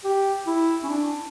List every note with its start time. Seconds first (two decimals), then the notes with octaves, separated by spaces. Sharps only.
0.04 G4
0.47 E4
0.83 C#4
0.89 D4